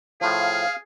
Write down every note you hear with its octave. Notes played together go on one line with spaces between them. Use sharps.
A2 F3 G#4 F5